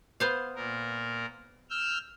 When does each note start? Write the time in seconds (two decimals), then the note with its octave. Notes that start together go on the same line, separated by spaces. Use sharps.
0.20 B3 C5 F5
0.55 A#2 A#4
1.70 E6 F6 G6